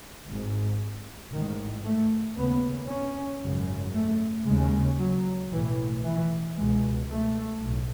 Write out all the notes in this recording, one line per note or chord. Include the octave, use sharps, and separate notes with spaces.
G#1 G#2
A1 G#2 D#3
A3
D#2 C#3 B3
C#4
G#1 F#2 C#3
A3
D#2 C#3 G#3
F#3
B1 A2 E3
E3
C#2 B2 G#3
A3
B1 A2